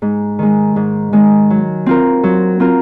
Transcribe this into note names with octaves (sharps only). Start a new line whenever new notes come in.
G#2
D#3 G#3
G#2
D#3 G#3
F#3
C4 F4 A#4
F#3
C4 F4 A#4